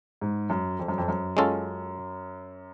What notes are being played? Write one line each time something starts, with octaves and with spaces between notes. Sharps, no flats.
G#2
F#2
F2
F#2
F2
F#2
G#3 C#4 F4 A4